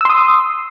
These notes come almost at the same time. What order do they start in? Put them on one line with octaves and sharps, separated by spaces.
E6 C6 D#6